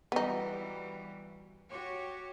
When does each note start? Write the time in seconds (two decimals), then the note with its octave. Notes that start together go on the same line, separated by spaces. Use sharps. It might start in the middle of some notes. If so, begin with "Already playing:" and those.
0.12 E3 G3 B3 D#4 F#4
1.69 F#4 G4 C#5